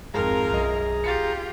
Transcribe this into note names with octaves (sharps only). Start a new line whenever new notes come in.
G#1 F2 F4 G#4 A#4 A#5
B1 F#2 D#5 D#6
F4 G4 A6 C#7